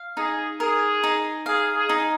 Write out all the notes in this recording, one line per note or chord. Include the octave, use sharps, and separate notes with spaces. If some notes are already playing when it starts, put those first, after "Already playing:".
Already playing: F5
D#4 G#4
G#4 A#4
D#4
G#4 F5
G#4
D#4